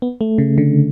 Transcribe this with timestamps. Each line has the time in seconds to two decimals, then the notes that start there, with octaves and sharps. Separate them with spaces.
0.02 B3
0.21 A3
0.38 C#3
0.58 D3